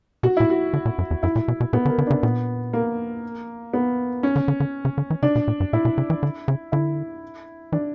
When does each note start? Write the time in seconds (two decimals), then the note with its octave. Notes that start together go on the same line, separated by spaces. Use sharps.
0.23 B2 F#4
0.37 A#2 E4
0.50 F#4
0.73 D3
0.85 A#2
0.98 F#2
1.11 E2
1.23 F#2 E4
1.36 A#2
1.48 B2
1.60 B2
1.73 A#2 B3
1.85 D3
1.89 A#4
1.98 D3
2.07 C#3 D4
2.23 A#2 B3
2.73 A#3
3.74 B3
4.23 C#4
4.36 D3
4.48 D3
4.60 D3
4.85 C#3
4.98 D3
5.10 E3
5.23 C#3 D4
5.35 B2
5.48 A#2
5.60 G2
5.73 A#2 E4
5.85 B2
5.98 C#3
6.10 E3
6.23 D3
6.48 C#3
6.72 D3 E4
7.72 E3 D4